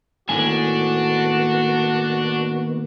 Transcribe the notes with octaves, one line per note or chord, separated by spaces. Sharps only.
A2 D#3 A#3 B3 D4 F#4 G#5